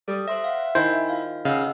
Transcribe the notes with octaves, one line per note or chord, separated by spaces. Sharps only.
G3 A4 D#6
C5 E5 C6 A#6
F5 F#5
D#3 E4 C5 G#5
F4 F5
C#3 D#5 F5 F#5 E6